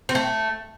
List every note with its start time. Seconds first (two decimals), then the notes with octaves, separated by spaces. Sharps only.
0.09 C4
0.15 A3